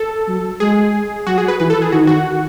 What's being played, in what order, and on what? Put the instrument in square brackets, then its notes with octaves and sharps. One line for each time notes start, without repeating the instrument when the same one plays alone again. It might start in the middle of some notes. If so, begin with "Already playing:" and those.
Already playing: [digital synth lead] A4
[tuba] F#3
[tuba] G#3 [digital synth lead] G#4
[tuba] F#3 [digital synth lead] F#4
[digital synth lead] G#4
B4
[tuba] E3 [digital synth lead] B4
[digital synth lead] A4
G#4
[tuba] D#3 [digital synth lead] F#4
[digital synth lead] F#4